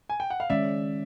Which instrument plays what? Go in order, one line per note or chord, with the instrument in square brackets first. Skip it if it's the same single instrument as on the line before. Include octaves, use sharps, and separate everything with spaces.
[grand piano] G#5
G5
F#5
F5
[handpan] D#3 G#3 C#4 [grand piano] D5 E5